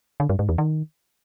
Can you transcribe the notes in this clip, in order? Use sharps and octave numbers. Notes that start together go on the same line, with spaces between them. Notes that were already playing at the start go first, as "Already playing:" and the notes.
D3
G2
G#2
E2
D#3